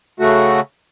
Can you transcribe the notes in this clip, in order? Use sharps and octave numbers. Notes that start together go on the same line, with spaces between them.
C#3 A3 F#4